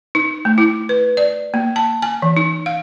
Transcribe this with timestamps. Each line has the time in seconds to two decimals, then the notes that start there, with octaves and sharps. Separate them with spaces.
0.15 D#4
0.45 A3
0.58 E4
0.89 B4
1.17 D5
1.54 A#3
1.76 A5
2.02 G#5
2.22 E3
2.37 D#4
2.66 F5